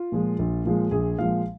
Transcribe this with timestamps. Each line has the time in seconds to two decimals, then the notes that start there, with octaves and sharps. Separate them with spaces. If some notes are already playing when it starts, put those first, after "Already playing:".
Already playing: F4
0.12 A#2 F3 G#3
0.39 A#1
0.65 A#2 F3 G#3
0.91 A#1 G#4
1.18 A#2 F3 G#3 F5